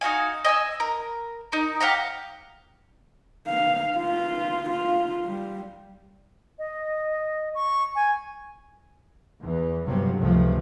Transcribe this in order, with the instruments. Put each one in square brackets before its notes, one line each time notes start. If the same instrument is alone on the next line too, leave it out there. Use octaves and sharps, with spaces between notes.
[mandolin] D#4 F#4 F5 G#5
D#5 G#5 D6 E6
A#4
D#4 A#4
G4 F5 F#5 A#5
[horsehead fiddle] F5
F4
F4
G3
[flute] D#5
C#6
G#5
[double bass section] E2 E3
G1 G2 C3 F3 F#3
C#2 G2 C3 F3 A3